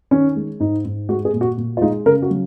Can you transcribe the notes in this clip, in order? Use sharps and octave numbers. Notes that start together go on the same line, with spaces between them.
D#3 C#4
G#3
G#2 D#4
G#2
G#3 F#4
G#4
A#2
F#4
A#2
F4
G#3 D#4
C#3 A#4
F#4
F#3